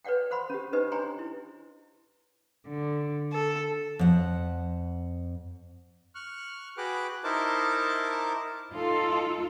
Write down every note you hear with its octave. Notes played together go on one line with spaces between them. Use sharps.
B4 C#5 D5 F#5 G5
C5 F#5 B5 C6
C#4 G4
D4 D#4 G4 B4 C5 D#5
C#5 G5 G#5 A#5 C6
E4
D3
A4
F2 F#5
C#6 F6 F#6
F#4 G#4 B4 G5 D6 F#6
D#4 E4 A#4 C5 A5 D6
D#4 F4 A4